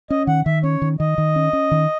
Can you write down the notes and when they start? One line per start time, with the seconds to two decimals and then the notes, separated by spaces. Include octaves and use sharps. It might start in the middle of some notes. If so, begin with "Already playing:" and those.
0.10 C#4 D#5
0.27 D#3 F#5
0.46 D#3 E5
0.64 C#4 C#5
0.82 D#3
1.00 D#3 D#5
1.18 D#3
1.36 C#4
1.53 C#4
1.71 D#3